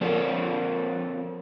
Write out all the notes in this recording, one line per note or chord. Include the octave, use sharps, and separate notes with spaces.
F3 C4 A4 A#4 C#5